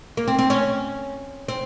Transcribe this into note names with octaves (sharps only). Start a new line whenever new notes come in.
A#3
C4
C4
C#4
C4